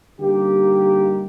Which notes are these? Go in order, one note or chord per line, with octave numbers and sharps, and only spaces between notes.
D3 G3 A#3 D#4 G4